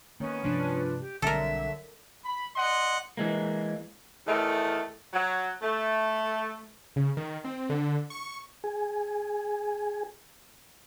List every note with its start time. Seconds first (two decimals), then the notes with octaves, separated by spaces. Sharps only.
0.20 D#3 A#3 B3 C#4
0.43 G2 C3 F3 A3 D4 B4
1.00 G4
1.22 B1 D3 F#3 G3 C4 A4 A#4 E5
2.25 B5
2.56 D5 D#5 F#5 C6
3.17 E3 G#3 A#3
4.27 E2 D#3 A3
5.13 F#3
5.62 A3
6.96 C#3
7.17 D#3
7.44 C4
7.69 D3
8.10 C#6
8.64 G#4 G#5